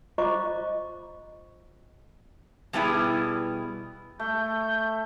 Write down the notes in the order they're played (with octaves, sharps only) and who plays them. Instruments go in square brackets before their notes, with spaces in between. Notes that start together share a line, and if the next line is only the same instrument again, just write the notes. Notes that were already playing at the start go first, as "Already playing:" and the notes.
[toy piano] F4 C5 D#5 A#5 C#6 D6
[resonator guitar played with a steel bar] B2 G3 B3 E4 G#4
[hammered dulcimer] A3 [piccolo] G6